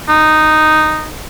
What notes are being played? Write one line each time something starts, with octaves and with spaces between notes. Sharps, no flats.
D#4